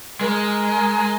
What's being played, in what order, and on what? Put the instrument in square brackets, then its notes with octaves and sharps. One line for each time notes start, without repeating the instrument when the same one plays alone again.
[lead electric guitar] G#3 [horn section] A#4